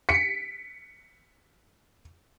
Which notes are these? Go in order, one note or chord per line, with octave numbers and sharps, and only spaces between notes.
B6 C#7 D7